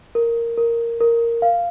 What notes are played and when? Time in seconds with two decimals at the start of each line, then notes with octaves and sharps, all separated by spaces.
0.15 A#4
0.58 A#4
1.00 A#4
1.42 F5